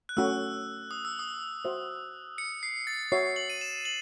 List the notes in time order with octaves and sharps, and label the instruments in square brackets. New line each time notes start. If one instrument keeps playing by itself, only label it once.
[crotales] F#6
[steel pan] A3 C#4 F#4 [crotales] E6
[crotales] D#6
E6
D#6
[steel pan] F#4 C5 E5
[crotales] C#7
C7
A6
[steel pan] F#4 C#5 E5 [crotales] C7
[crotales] F#7
D#7
E7
F#7